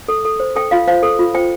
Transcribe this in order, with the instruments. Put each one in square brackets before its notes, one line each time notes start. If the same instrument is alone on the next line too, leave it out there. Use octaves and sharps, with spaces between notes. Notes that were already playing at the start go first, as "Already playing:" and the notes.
[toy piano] A4
A4
C5
A4 G5
F4 F5
C5 F5
A4
F4
C5 G5